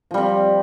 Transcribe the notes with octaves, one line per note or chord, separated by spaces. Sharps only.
F3 G3 C4